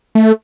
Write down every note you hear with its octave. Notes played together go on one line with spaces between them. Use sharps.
A3